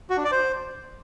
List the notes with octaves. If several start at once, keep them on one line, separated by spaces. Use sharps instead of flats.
F#4
D4
D5
C5